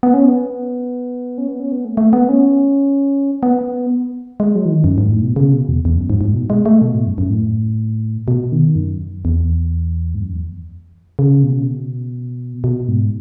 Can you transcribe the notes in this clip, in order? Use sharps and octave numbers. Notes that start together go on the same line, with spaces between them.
B3
C#4
B3
C#4
B3
C#4
B3
A3
A3
B3
C#4
B3
G#3
F#3
E3
D#3
F#2
G#2
A2
B2
C#3
B2
E2
E2
F#2
G#2
G#2
B2
G#3
A3
B2
A2
F#2
F#2
A2
B2
D#3
F#2
E2
G#2
F#2
E2
C#3
B2
C#3
B2
B2
G#2